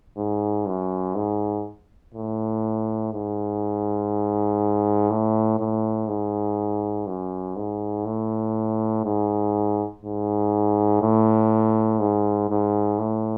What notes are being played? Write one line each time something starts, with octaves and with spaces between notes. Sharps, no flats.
G#2
F#2
G#2
A2
G#2
A2
A2
G#2
F#2
G#2
A2
G#2
G#2
A2
G#2
G#2
A2